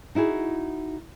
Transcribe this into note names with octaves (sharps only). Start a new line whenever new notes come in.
D#4 E4 F#4 G#4